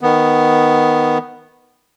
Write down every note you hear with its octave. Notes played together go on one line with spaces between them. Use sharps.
D#3 B3